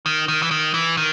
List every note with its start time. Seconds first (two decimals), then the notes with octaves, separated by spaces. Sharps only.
0.06 D#3
0.28 D#3
0.42 E3
0.51 D#3
0.74 E3
0.97 D#3